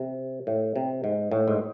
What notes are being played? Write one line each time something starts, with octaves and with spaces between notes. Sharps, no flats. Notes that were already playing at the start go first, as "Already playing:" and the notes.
Already playing: C3
A2
C3
G#2
A2
G#2